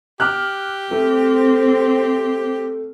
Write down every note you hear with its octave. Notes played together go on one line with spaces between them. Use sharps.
G4 D6 F6 F#6
A3 C4